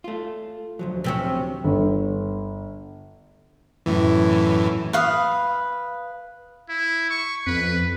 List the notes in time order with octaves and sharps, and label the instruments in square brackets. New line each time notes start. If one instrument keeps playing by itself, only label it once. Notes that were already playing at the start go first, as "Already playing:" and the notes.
[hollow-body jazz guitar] A3 F4
D2 F3 F#3
[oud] C3 C4 C#4
[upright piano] G1
[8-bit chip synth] F#2 A2 E3
[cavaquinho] B4 F5 D#6
[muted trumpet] E4
C#6
[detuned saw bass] F2 [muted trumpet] B4